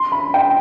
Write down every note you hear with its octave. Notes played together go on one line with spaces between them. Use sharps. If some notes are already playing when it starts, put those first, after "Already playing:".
Already playing: C6
B5
G5